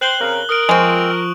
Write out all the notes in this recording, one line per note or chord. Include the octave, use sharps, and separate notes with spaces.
C5 G5 F#6 F#7 G7
C#3 C4 A#4
A#4 D#6 F6 D7
F3 G#3 C4 C#6 F7